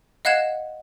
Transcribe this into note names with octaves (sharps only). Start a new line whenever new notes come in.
D#5 F5 F#5 F#6 G#6 E7